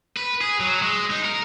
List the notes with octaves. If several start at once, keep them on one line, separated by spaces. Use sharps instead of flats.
B4
G#4
F#3
G#3
D#4
A#4